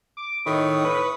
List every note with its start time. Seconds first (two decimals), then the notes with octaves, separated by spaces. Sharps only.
0.17 D6
0.46 A2 D#3 B5 C#6 D#6
0.85 B4